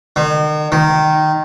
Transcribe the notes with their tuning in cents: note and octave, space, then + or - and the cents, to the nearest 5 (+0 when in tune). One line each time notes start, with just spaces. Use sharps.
D#3 -40
D#3 -10